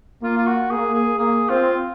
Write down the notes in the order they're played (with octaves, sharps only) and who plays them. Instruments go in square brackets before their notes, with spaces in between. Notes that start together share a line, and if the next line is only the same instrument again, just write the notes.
[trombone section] A#3 [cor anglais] F4
[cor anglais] F4
F#4
[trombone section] A#3 [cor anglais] G#4
[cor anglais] G#4
[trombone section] A#3 [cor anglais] G#4
[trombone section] C4 [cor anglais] F4